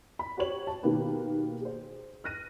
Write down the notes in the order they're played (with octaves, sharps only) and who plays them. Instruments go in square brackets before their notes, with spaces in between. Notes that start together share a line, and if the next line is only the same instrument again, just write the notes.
[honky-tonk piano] B5
F#4 G4 C5 C#5 F#7
A5
B2 D#3 A#3 B3 G4 B4
G#4 C5
F6 F#6 A#6 D#7